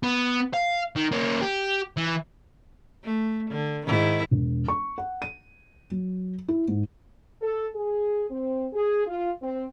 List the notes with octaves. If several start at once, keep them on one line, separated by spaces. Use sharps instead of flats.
B3
F5
D#3
A#3 C#4
G4
E3
A3
D3
G#2 D#3 E4
E1
C#6
F#5
D#7
F#3
E4
G#2
A4
G#4
C4
G#4
F4
C4